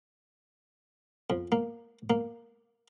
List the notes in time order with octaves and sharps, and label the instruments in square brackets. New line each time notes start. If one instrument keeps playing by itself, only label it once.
[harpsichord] F2
A#3
A#3